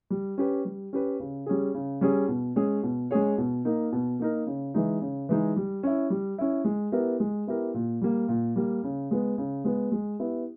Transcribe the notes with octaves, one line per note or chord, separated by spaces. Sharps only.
G3
C#4 G4 B4
G3
C#4 G4 B4
C#3
G3 C#4 G#4
C#3
G3 C#4 G#4
B2
G#3 C#4 G#4 C#5
B2
G#3 C#4 G#4 C#5
B2
A#3 D#4 A#4
B2
A#3 D#4 A#4
C#3
E3 G#3 D#4
C#3
E3 G#3 D#4
G3
C#4 E4
G3
C#4 E4
G#3
B3 E4 G4 A#4
G#3
B3 E4 G4 A#4
A#2
G3 A#3
A#2
G3 A#3
C#3
G#3 B3
C#3
G#3 B3
G#3
B3 E4 G4